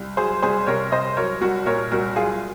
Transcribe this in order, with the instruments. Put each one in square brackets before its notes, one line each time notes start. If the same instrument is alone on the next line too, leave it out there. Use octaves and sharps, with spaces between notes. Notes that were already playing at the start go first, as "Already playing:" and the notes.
Already playing: [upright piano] C2
F#3 G#4 C5
C2 G#4 C5
C3 A#4 C#5
C2 C5 D#5
F#3 A#4 C#5
C2 F#4 A#4
A#2 A#4 C#5
C2 F#4 A#4
F#3 F4 G#4